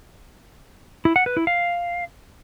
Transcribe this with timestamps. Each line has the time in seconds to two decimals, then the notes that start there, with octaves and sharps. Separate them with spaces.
1.05 E4
1.16 F#5
1.26 B4
1.37 E4
1.47 F5